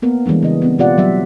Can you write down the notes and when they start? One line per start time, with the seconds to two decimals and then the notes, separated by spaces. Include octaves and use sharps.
0.02 A#3 B3 A#4
0.26 E3 G3 G#3 D4
0.43 C#3 D#5
0.62 B3 C4
0.79 B2 F4 G4 D5 F#5
0.98 F#3 G3 E5